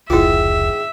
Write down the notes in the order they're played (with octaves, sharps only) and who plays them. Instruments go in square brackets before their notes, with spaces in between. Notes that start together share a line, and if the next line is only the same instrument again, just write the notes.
[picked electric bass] F1 C#2 [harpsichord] G#2 D#3 [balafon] E4 F4 [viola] E5